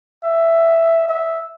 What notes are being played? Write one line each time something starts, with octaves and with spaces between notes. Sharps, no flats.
E5
E5